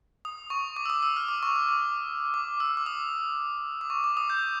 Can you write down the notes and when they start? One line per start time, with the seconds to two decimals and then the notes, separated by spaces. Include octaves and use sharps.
0.25 D#6
0.50 C#6
0.77 D6
0.86 E6
0.90 D#6
1.03 E6
1.17 F6
1.28 D6
1.43 C#6
1.56 D6
1.69 D6
2.34 D6
2.60 E6
2.77 D6
2.86 D#6
3.81 D6
3.90 C#6
4.04 D6
4.17 D#6
4.30 G6